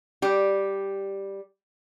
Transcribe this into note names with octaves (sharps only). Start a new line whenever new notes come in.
G3 G4